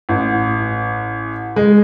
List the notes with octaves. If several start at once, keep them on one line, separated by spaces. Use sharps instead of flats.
A1
G#3